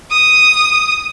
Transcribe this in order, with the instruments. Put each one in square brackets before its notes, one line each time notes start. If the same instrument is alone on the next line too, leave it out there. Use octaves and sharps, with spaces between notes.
[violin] D#6